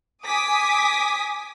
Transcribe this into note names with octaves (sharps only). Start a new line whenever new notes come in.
G#5 D6 D#6 B6